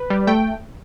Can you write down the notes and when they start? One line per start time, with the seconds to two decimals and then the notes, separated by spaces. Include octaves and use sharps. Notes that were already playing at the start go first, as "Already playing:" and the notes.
Already playing: B4
0.10 G3
0.27 A3 G5